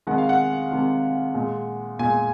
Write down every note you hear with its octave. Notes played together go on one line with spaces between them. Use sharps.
C3 D#3 G#3 F#5
F5
F#5
C3 D#3 G#3
A#2 G#3
A#2 G#3 G#5